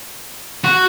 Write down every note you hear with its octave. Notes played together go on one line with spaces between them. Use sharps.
F#4